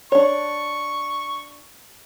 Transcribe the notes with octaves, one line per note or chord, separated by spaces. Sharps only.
D4 C#5 C#6